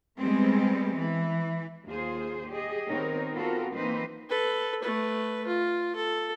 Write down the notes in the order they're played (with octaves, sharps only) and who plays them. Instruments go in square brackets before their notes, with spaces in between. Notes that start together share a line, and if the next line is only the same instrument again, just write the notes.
[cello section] G3 G#3 B3 C4
E3
D#2 F4 G#4 C5
G4 G#4 D#5
D#3 B3 C4 D#4 A#4 C#5
B3 C4 F4 F#4 A4 A#4
E3 A#3 C4 D#4 B4 C5
[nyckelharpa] A4 B4
A3 B4
F4
A4